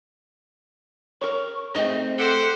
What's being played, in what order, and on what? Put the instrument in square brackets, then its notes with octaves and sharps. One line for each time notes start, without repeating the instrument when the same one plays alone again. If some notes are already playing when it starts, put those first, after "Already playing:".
[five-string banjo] A#4 C#5 [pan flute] C#6
[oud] A3 C4 G#4 [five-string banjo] D#4 [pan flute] D#5
[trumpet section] G4 C5 F#5 [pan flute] A4